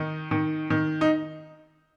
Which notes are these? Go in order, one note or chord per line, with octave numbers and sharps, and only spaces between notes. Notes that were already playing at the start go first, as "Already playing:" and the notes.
Already playing: D#3 D#4
D#3
D#3
D#4